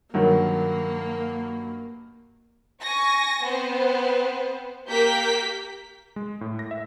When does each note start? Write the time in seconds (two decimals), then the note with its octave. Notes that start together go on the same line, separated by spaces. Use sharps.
0.14 G2 D#3 F#3 A#3
2.82 G#5 C#6 A#6
3.45 B3 C4 C5
4.89 A#3 G4 A#4 G6 B6
6.16 G#3
6.41 A2
6.59 A#6
6.71 E5